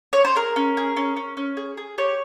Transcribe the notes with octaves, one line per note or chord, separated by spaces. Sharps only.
C#5
C5
G#4 A#4
C#4
G#4
C#4
C#4
C#4
G#4
G#4
G4 C#5